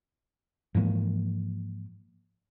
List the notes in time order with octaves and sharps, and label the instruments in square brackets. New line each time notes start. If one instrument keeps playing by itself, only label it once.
[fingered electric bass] G#2 E3 F3 A#3